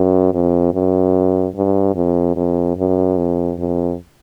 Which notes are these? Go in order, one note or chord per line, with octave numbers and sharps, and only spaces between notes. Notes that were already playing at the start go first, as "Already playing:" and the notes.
Already playing: F#2
F2
F#2
G2
F2
F2
F#2
F2
F2